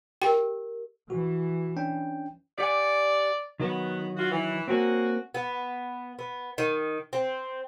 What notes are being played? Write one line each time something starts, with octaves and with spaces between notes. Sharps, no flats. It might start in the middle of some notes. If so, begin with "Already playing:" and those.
G4 A#4 G5
E3 F#4
C#4 D4 G5
G4 D5 F#5 G#5
D#3 F#3 B3
F4 F#4
E3
A#3 C4 C#4 F#4
B3
B3
D#3
C4